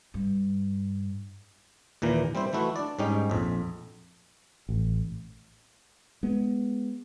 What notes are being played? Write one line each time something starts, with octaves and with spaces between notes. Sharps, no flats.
G2
D#2 A#2 E3 A#5
G3 C4 E4 C5
E3 A3 E4 F#4
D4 D5
G#2 G3 C#4 D#4 G4
A#1 F2
A1
G#3 B3